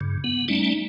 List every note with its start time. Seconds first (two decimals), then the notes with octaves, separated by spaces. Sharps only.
0.01 G2 C#3
0.24 B3
0.48 G3 A3 C#4 D#4